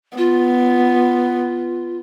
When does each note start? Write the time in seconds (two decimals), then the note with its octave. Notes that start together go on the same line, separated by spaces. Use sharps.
0.17 B3 F4